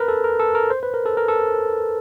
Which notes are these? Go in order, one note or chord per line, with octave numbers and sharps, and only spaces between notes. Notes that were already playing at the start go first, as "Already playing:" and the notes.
Already playing: A#4 B4
A4
A#4
A4
A#4
C5
B4
A#4
A4
A#4
A4